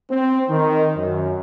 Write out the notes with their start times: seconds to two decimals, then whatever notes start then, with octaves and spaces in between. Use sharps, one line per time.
0.11 C4
0.49 D#3
0.96 F#2